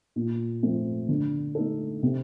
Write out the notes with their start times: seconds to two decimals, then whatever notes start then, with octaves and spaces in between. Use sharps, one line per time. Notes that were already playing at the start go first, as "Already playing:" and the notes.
0.16 A#2
0.63 F3 A3 C4
1.09 D3
1.55 A3 D#4 A4
2.03 C3